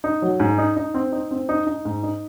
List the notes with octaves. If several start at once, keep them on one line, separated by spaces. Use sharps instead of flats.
D#4
F#3
G#2
D#4
D#4
C4
D#4
C4
D#4
D#4
G#2
D#4